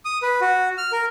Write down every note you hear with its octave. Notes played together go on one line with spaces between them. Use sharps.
D#6
B4
F#4
F6
A#4